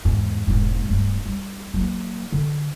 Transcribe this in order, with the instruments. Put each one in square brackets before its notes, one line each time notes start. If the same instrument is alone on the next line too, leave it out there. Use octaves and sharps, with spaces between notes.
[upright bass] E2 G#2
E1 G#2
D1 G2
G3
F#3 A#3
D3